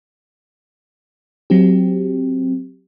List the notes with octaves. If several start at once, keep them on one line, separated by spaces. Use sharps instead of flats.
F#3 C4 G4